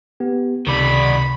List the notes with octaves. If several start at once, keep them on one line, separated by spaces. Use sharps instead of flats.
B3 G4
C#2 C3 D#3 D5 B5